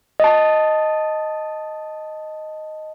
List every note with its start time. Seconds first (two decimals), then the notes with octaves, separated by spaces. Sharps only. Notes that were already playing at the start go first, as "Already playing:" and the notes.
0.20 D#5 A5